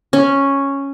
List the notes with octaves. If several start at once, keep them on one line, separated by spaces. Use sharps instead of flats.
C#4